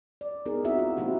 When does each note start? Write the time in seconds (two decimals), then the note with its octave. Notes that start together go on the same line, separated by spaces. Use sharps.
0.21 D5
0.46 B3 D#4 G#4 A#4
0.65 C4 D#4 E4 F#4 E5
0.79 F4
0.97 A#3 C4 D#4 E4 F#4 G4